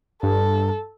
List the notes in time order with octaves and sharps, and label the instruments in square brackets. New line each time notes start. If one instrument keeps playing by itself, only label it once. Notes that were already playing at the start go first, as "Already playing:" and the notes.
[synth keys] G2 [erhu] A4